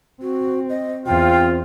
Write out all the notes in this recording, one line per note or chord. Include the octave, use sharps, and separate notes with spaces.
C4 F#4
D#5
E2 C4 F4 G5